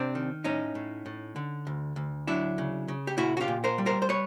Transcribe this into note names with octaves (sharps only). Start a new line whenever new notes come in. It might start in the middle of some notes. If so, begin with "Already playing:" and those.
Already playing: C3 C4 D4
D#3
A2 C#4 D#4
A2
A2
D3
D2
D2
F#3 D4 E4
C#3
C#3
G4
A#2 E4 F#4
F#4
F4 G4
A#2
A#4 C5
G3
A#4 C5
C5
B4 C#5